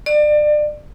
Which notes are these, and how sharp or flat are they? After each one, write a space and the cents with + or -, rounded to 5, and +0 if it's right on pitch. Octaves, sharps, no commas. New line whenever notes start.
D5 +30